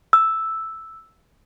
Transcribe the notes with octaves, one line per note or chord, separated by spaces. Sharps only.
E6